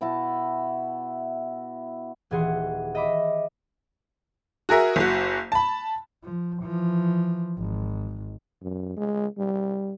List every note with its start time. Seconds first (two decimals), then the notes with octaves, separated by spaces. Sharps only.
0.01 B2 E4 F#4 A5
2.31 D#1 E3 G#4 F#5 C6
2.95 D#5 E5 B5 D6
4.69 F#4 G#4 A#4 E5
4.96 F#1 F#4
5.52 A5 B5
6.24 F3
6.59 E3 F3
7.58 G#1
8.62 F#2
8.97 G#3
9.38 G3